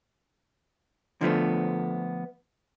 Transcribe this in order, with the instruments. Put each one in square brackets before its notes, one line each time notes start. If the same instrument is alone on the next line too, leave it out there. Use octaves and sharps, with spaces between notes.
[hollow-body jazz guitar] D3 F3 A3 B3